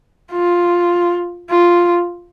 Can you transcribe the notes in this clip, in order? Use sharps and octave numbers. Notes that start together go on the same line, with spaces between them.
F4
F4